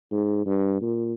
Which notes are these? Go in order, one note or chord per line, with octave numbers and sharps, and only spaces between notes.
G#2
G2
A#2